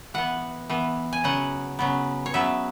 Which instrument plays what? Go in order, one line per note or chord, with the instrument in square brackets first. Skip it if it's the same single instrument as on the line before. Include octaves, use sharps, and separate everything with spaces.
[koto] E3 B3 F#5
E3 B3
G#5
C#3 F#3 B3 F#5
C#3 F#3 B3
C#5
C#3 F#3 B3 E5